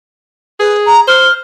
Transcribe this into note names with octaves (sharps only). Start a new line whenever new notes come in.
G#4 B4
A#5
C5 F6